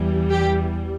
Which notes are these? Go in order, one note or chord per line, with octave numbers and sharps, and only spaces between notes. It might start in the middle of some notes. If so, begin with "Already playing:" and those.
Already playing: E2 E3 G3
G4